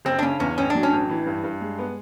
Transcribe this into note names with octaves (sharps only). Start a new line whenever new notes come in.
F#1 C4
D4
C#3 C#4
E2 C#4
A1 C#4
D4
F#3
C#4
A1
E3
G2
G2
G#3
B3